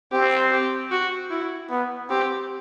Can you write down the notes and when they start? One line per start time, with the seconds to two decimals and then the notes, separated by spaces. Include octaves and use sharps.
0.12 C4 G4
0.52 G4
0.91 F#4
1.31 E4
1.70 B3
2.10 C4 G4